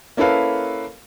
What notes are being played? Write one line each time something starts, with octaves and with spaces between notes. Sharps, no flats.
A#3 C#4 E4 A4 B4 F5